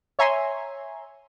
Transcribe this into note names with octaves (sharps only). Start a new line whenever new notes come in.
C#5 E5 G#5 A#5 C6